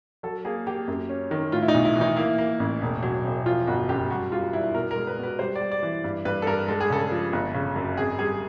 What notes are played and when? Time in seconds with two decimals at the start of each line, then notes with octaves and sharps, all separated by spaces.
0.23 F#3 A4
0.45 A#3 G#4
0.66 A#3 G4
0.88 F#2
1.09 C#4
1.31 D#3
1.52 A2 F4
1.62 E4
1.68 D#4
1.74 B1
1.85 E4
1.96 E3
2.01 D#4
2.16 A#3 E4
2.38 A#3
2.60 A1
2.81 E1
3.03 F#3
3.25 E1
3.45 F3 F4
3.67 G1 F#4
3.89 F#2 G4
4.10 G3 F#4
4.32 G3 F4
4.53 G2 E4
4.75 B2 A#4
4.91 A#4
4.96 G#3
5.07 B4
5.18 B2
5.23 B4
5.39 G3 C5
5.56 D5
5.61 G3
5.72 D5
5.83 E3
6.04 G2
6.25 G2 B4
6.42 A4
6.47 G2 A#4
6.68 G#3 A4
6.80 G#4
6.90 C#3 A4
7.11 F3
7.33 G1
7.54 C#3
7.76 F#2
7.97 G#1 G#4
8.18 G3 G#4